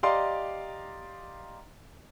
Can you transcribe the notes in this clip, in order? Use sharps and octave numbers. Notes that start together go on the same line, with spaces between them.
G4 D5 D#5 F5 A#5 C6